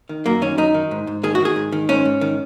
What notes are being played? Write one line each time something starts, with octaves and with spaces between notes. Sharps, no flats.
D#3
F#2 A#3
D#3 C#4
F#2 D#4
D#3
G#2
G#2
D#3 G#4
F#4
D#3 G#4
G#2
D#3
G#2 C#4
G#2
D#3